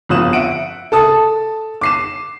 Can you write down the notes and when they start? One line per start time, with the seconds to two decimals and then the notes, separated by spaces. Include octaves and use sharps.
0.09 G1 F2 F4 D#6 F#6 E7
0.33 E5 F#5 D7
0.92 A4 A5 D#6
1.81 D6 C7 E7